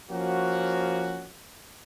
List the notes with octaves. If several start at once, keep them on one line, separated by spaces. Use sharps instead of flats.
F3 A#3 C#4 F#4